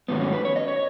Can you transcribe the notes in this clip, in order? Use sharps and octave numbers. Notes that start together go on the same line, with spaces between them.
G#2 D#3 F#3 A3 B3
C#4
B4
C#5
D#5
C#5